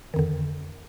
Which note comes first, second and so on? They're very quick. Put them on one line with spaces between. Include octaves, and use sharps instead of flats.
D#3 F2 D3